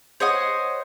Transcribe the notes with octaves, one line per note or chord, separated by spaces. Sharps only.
C5 C#5 D#5 F#5